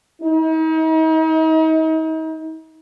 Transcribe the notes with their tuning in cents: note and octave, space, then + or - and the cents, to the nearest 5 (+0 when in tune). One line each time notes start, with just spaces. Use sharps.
D#4 +40